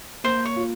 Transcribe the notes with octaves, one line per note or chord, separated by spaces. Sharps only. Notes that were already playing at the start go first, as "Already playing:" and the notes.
A#3 C5
C#5
F4